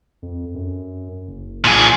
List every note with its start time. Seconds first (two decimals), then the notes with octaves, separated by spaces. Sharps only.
0.22 F2
0.54 F#2
1.28 F#1
1.64 B1 A#2 G#4